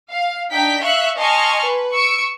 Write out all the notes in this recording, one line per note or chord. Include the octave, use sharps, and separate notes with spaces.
F5
D4 D#4 G5 B6
E5 F5 C#6 F#6
D#5 G#5 A5 C6 C#6 F6
B4
C#6 E6 C#7 D7